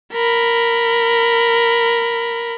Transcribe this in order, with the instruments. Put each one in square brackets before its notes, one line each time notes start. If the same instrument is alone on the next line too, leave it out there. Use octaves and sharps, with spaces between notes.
[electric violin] A#4 B5